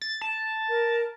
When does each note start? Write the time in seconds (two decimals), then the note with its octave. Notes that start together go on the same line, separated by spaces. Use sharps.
0.01 A6
0.21 A5
0.69 A#4